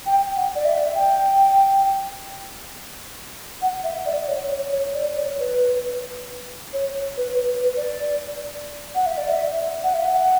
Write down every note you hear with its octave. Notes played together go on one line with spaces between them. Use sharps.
G5
F#5
D5
E5
G5
F#5
E5
D5
C#5
C#5
C#5
D5
C#5
B4
C#5
B4
B4
D5
F#5
E5
D5
E5
F#5
E5
F#5